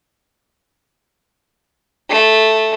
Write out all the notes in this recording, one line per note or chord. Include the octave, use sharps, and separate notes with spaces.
A3